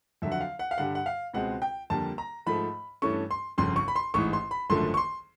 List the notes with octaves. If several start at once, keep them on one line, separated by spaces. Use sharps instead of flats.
F2 D3 F#3 E5
F#5
F5
F#5
F5
G2 D3 G3 F#5
F#5
F5
C#2 B2 G#3 C4 F#5
G5
F2 D3 G3 A#3 A5
A#5
G#2 F3 A3 B5
G2 E3 A3 C#4 C#6
C6
G1 F2 C#3 C6
C#6
B5
C6
A1 G#2 E3 C#6
C6
B5
G#1 F#2 D3 F3 A3 C6
C#6
C6